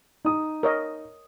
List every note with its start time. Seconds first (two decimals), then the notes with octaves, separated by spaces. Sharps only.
0.25 D#4 D#6
0.63 A#4 C#5 D#5